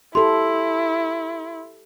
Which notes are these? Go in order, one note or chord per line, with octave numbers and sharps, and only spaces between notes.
E4 G4 A4 C6